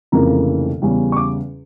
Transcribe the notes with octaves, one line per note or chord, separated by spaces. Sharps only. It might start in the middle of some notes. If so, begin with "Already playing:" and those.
F1 F2 C#3 E3 A#3 A#5
E2 C#3 G3 C#4
C#6
D6